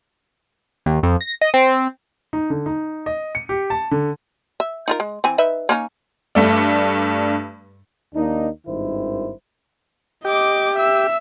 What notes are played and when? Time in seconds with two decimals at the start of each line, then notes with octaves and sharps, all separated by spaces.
0.86 D#2
1.03 F2
1.21 A#6
1.41 D#5
1.54 C4
2.33 D#4
2.50 D3
2.66 D#4
3.06 D#5
3.35 C#7
3.49 G4
3.70 A5
3.91 D3
4.60 E5
4.88 D#4 F4 A#4
5.00 G#3
5.24 E3 C4 G#5
5.38 D#4 B4 E5
5.69 A#3 C#4 D#4
6.35 G2 A3 D4
8.14 D#2 A#3 D4 D#4
8.67 G#1 G2 D#3 E4 C5
10.25 G4 D#5 D6
10.76 E5 E6